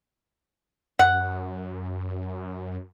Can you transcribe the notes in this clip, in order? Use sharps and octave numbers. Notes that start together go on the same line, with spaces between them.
F#2 F#5